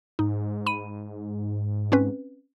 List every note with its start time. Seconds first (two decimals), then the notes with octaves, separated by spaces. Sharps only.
0.19 G#2 D#4
0.66 B5 D#7
1.92 C4 C#4 B4